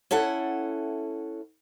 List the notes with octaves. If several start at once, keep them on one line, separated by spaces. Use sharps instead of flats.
C#4 E4 A4 F#5